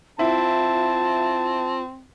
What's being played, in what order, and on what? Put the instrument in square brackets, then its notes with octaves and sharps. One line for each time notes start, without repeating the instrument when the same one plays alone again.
[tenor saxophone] C4 [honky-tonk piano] E4 [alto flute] F4 [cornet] A5